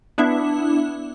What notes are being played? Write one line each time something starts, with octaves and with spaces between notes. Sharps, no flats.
B3 D4 E4 E5